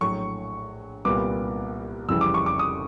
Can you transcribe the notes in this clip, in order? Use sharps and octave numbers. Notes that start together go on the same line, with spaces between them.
A#1 A2 F#3 C#6
C2 A#2 G3 B3 D6
F1 F2 C#3 E3 G3 E6
D6
C#6
D6
D#6